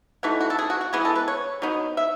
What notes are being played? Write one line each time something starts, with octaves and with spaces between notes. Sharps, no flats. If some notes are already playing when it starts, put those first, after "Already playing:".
E3 A3 D#4 F#4
F#4
A4
G#4
F#4
F#4
E3 G#3 B3 G#4
A4
B4
C#5
F#3 B3 D#4
E5